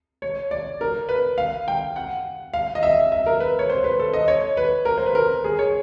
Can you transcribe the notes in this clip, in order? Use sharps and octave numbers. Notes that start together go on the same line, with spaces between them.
C#5
D5
A#4
B4
F5
G5
F#5
F5
D#5
E5
E5
A#4
B4
C#5
C5
B4
A4
D#5
C#5
B4
A#4
C5
B4
A#4
G#4
C#5